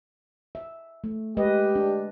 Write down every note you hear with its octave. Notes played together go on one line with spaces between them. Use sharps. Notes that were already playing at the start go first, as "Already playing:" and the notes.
E5
A3
G#3 G4 B4 D#5
D4